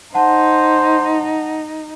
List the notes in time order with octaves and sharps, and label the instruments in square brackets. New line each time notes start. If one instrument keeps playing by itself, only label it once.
[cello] D#4 [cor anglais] C5 [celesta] F#5 A5